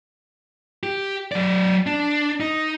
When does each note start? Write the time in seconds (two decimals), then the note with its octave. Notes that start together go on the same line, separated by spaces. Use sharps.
0.83 G4
1.32 F#3 D5
1.86 D4
2.40 D#4